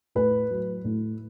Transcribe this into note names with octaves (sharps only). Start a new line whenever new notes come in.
A2 B4
F#3
A2